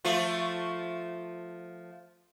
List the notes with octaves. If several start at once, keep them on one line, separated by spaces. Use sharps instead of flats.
F3 A3 F4